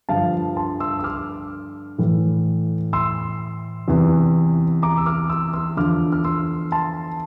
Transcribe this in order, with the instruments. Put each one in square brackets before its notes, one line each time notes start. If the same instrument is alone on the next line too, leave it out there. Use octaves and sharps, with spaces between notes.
[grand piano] G2 D3 F3 F5 A5
A5 C6
C6 E6
E6
D6 F6
A2 E3
C6 E6
E2 C3 E3
A#5 D6
E6
D6 F6
C6 E6
C6 E6
E2 D3 F3 D6 F6
F6
C6 E6
A5 C6